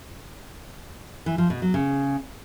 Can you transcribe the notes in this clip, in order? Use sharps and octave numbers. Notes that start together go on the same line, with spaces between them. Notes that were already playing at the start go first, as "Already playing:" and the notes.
E3
F3
B2
F#3
C#3